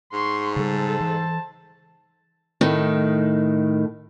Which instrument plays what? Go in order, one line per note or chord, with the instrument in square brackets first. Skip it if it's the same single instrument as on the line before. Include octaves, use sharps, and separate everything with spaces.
[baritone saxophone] G#2 [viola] C6 C#6
[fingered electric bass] C#3 G3 [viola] A4 [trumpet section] C5 A5
[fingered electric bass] E3
[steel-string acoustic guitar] A2 D#3